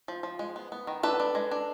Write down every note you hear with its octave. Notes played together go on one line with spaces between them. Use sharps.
F3
F3
G#3
B3
B3
D#3
D4 A4 B4
D4
G#3
D4